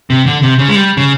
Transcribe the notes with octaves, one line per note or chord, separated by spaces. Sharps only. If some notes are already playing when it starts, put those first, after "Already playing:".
C3
D3
C3
C#3
G#3
G3
C#3